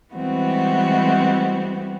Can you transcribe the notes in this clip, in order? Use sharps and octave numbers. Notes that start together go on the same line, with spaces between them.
E3 G3 G#3 B3 C4 F#4